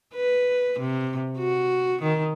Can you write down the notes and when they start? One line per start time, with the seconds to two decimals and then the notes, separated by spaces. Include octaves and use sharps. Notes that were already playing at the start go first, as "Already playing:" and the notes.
0.14 B4
0.79 C3
1.39 F#4
2.02 D#3